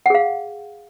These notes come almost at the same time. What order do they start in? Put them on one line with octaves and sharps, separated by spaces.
F#5 G#4 F5